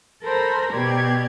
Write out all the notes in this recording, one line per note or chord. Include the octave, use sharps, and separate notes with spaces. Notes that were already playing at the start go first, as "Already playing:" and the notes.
A4 A#4 C5 A#5 B5
B2 G4 D5 G#6